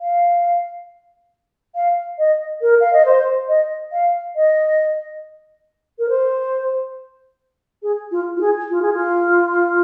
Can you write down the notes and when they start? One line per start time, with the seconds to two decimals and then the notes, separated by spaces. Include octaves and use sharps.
0.01 F5
1.75 F5
2.18 D#5
2.61 A#4
2.80 F5
2.93 D#5
3.05 C5
3.48 D#5
3.92 F5
4.36 D#5
5.98 A#4
6.09 C5
7.82 G#4
8.11 F4
8.36 F4
8.41 G#4
8.70 F4
8.82 G#4
8.93 F4